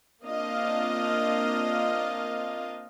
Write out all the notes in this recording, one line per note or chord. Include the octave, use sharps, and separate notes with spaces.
A#3 C4 D4 F4 D#5 F5